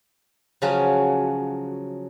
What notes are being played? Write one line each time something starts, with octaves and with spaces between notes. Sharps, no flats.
C#3 F3 F#3 C#4 F4 F#4